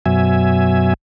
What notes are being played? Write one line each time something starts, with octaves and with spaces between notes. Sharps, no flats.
F#2 B2 F#3 E5 G#5